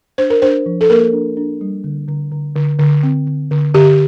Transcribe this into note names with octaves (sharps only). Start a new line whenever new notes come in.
D4 C5
A#4
D4 C5
F3
A4
A#3 A#4
D4
D4
G3
D3
D3
D3
D3
D3
C4
D3
D3
D3 G4